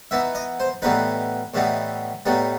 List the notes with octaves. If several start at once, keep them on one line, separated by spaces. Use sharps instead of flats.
E3 B3 D#4 E5
D#5
C5
A2 E3 G3 B3 D#4 B4
A2 E3 G3 B3 D#4
A2 G3 B3 D#4